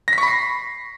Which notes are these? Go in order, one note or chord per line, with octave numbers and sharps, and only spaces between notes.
A#6
B6
C#6
B5
C7